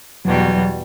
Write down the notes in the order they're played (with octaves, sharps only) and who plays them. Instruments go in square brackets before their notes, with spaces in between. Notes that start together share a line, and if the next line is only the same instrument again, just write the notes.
[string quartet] E2 B2 G3 [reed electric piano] F#3
[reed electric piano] F#3